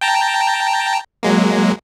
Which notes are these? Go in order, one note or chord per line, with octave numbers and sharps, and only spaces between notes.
G5 A5 A#5
F#3 G#3 A#3